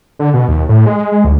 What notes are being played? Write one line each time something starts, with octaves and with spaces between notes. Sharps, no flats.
D3
B2
D#2
A2
G#3
G#3
D2